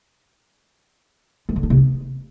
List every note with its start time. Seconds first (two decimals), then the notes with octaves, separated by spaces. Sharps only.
1.49 G#3
1.56 D3
1.63 D4
1.70 C3
1.77 B3